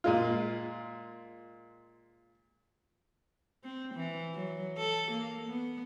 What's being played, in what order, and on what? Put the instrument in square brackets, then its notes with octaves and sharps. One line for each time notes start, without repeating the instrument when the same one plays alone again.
[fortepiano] A#2 G#3 F4
[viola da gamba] C4
E3
F#3
A4
A#3
B3